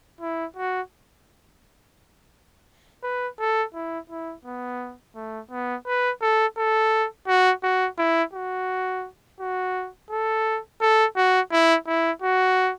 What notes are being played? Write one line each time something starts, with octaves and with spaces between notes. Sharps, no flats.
E4
F#4
B4
A4
E4
E4
B3
A3
B3
B4
A4
A4
F#4
F#4
E4
F#4
F#4
A4
A4
F#4
E4
E4
F#4